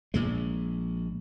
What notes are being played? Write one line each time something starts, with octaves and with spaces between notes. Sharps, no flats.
A#1 A#2 G#3